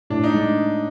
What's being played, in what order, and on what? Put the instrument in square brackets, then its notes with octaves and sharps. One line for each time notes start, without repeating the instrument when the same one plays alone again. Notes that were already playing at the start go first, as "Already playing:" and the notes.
[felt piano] A2 [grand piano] D4
[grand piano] D#4
[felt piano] G#3 [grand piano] D4